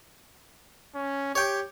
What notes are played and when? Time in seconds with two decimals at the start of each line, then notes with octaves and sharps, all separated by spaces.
0.95 C#4
1.35 G4 C#5 G5